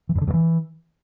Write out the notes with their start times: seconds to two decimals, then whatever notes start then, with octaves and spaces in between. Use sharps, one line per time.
0.09 E3
0.15 G2
0.21 D3
0.28 G2
0.34 E3